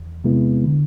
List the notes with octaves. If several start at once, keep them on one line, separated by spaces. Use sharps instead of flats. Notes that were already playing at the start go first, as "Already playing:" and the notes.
Already playing: E2
C3 G#3 B3 E4
D3